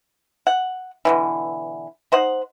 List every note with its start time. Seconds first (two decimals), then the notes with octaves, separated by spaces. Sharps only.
0.47 F#5
1.05 B2 D3 E3
2.12 D#4 C5 D#5 F#5